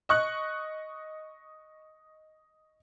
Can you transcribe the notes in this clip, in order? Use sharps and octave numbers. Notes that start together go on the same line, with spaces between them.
D#5 C#6 F#6